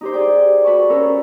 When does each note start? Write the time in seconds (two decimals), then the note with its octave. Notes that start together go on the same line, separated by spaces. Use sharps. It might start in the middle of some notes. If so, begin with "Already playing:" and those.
0.01 D#4 G4 C5
0.13 G#4 D5 G5
0.65 F#4 B4 A5 C#6
0.90 C#4 A4 A#4 C5